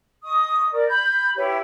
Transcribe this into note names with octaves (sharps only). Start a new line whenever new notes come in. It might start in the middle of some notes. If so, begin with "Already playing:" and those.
D#5 C#6 D#6
A#4 D5
B5 G6
E4 G4 B4 C#5